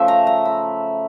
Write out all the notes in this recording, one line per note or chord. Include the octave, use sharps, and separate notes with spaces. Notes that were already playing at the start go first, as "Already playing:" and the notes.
Already playing: C#3 F3 A3 E5
A#5
A#5
B5